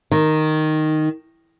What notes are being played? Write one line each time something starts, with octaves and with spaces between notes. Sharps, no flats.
D#3